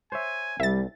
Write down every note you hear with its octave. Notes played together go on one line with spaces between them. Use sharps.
C5 C#5 E5 G#5
C2 G3 E5 A6